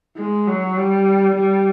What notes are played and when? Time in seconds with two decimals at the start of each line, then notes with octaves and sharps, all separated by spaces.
0.18 G#3
0.48 F#3
0.77 G3
1.36 G3